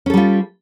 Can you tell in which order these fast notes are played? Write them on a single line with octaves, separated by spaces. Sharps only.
C#4 A4 G3 F4